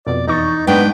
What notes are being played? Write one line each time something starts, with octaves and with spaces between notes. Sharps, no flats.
F2 B2 D5
E2 D#4 C#6 A6
G#2 B3 D4 G5